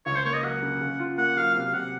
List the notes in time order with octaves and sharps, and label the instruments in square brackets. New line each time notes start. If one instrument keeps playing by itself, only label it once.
[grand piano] C#2 [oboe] C#5
[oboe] C5
[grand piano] A#3 [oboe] C#5
[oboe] D#5
[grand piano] F#3 [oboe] F#5
[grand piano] C#3
C#3
F4
[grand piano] A#3 [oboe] F#5
[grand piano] F#3 [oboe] F5
[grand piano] C3 [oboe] F5
[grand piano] C3 [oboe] F#5